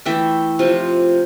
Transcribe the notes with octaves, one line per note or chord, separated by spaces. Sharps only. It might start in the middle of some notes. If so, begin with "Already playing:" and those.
E3 A3 E4 E5 G5
C3 F3 C4 F4